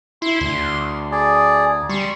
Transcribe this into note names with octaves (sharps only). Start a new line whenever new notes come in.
E4 C6
D2
G#4 D5
G3 C6 C#6